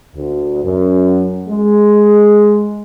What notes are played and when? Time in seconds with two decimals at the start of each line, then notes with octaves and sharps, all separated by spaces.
0.15 D2
0.64 F#2
1.48 G#3